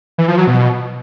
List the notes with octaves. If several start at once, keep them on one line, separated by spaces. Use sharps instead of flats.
E3
F3
F#3
B2